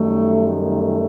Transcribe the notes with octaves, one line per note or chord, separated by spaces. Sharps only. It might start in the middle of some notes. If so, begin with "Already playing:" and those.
Already playing: F#2 D#3 G3 A3
A3